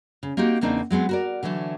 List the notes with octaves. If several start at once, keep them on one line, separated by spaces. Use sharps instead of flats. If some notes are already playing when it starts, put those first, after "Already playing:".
C#3
A#3 C4 D#4 F#4 G4
E2 C#3 A#3 C4 D4 D#4
F#3 G#3 B3 C4
F#4 A#4 D5
D3 E3 F#3 A3